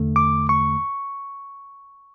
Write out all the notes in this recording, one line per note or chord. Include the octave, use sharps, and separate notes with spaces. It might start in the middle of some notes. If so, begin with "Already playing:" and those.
Already playing: E2 D3 A3
D6
C#6